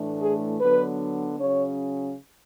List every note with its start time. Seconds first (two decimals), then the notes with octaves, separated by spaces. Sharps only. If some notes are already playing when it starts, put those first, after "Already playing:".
Already playing: A2 E3 A3 D4
0.21 G#4
0.60 D3 F#3 B3 D4 B4
1.39 C#3 F#3 C#4 C#5